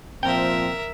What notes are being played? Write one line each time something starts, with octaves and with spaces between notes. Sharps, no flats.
A#2 F3 C4 A#4 E5 G5